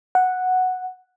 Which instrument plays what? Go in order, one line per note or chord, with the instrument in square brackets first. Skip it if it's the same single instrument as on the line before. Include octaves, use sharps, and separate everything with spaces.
[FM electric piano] F#5